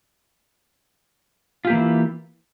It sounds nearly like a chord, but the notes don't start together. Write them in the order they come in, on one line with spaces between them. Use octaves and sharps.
F4 G4 A#3 E3 E4